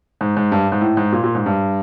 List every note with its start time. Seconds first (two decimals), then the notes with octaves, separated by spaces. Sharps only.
0.21 G#2
0.37 G#2
0.52 G2
0.72 G#2
0.81 A2
0.97 G#2
1.12 A#2
1.24 A#2
1.35 G#2
1.46 G2